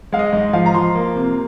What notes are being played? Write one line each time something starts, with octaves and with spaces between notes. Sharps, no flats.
G#3 F5
D#5
G#2 D#5
F3 F5
A#5
F3 C6
A#3
C3